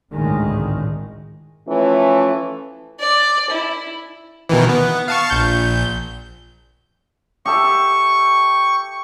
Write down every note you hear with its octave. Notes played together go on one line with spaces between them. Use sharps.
G#1 C#2 A2 D3 D#3 G#3
E3 F3 A3 C#4
D5
E4
B2 D#3 E3
B3
F5 A5 C#6
A#1 G6
G4 A4 E5 C#6